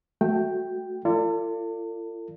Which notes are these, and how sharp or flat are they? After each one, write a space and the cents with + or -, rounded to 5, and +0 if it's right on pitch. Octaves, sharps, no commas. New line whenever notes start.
A3 -15 F#4 +0 G5 +0
F4 -35 A4 +40 D5 +0